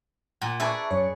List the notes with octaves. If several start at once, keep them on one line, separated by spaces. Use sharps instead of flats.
A#2 F#5
G#4 B4 D5 E5 A5 C#6
F#2 C#5 C#7